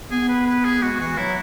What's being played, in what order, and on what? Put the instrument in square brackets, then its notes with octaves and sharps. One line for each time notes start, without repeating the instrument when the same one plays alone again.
[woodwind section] B3 [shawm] G#4
[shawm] B4
B4
G#4
[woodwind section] G#3 [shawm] F#4
[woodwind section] E3 [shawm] F#4
[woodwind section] F#3 [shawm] E4